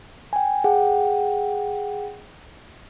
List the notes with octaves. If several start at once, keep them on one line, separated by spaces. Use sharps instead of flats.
G5 G#5
G#4 F#5 G5